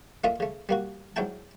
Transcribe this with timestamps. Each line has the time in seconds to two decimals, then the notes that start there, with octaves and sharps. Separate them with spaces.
0.24 A3 A#3 D4 F4 D#5 E5
0.40 C#3 A3
0.69 G3 A#3 F#4
1.16 G#2 F#3 D4 E4 G5 A5